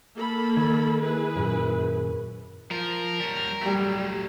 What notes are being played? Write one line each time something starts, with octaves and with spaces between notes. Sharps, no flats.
A#3 A4 B5
D#3 G#6
E4 G#4 B4
F#2 A#2
F3 A#4
G3 C#5
F#3 G3 A3